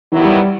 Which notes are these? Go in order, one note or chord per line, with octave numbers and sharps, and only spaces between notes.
D#3 E3 F#3 B3 E4 G4
G3
G3